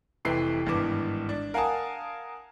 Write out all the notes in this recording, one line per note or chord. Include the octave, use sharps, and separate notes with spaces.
F1 C3 E3 B4 G5 C7
G#1 G2 E3 B3 D6
D4
A#4 F5 F#5 G#5 A5 D#6